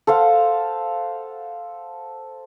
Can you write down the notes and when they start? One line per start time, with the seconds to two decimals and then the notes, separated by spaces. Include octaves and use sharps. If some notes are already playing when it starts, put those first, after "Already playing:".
0.07 A4 C5 F5 F#5